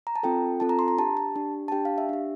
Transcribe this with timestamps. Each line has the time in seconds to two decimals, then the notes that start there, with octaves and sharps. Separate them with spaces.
0.07 A#5
0.16 A5
0.23 C4 F4 A4 G5
0.60 C4 F4 A4 A5
0.69 A#5
0.79 C6
0.88 A#5
0.98 D4 G4 A5
1.17 A5
1.36 D4 G4
1.68 A5
1.72 D4 G4 G5
1.85 F5
1.98 E5
2.09 D4 G4